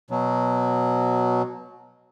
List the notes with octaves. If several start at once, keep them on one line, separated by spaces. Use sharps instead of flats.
B2 F#3